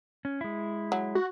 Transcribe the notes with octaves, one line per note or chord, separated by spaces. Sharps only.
C#4
G#3 E4
F#3
F#4